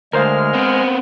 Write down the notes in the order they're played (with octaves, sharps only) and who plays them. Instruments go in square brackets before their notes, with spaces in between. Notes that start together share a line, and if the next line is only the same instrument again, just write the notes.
[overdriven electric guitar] D2 [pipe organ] G#3 F6 [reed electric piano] A#4 C5 F5
[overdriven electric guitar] B3 C4